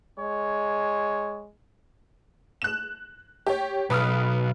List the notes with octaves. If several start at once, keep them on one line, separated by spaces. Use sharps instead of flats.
G#3 C#5
F#6 E7
G4 C#5
B1 B4 D#6 F6